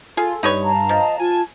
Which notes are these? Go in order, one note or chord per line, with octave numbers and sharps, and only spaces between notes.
F4 G#4 A4
G2 D#4 B4 C#5
F5 A5 A#5
F3 D#5
F4 G#5 A5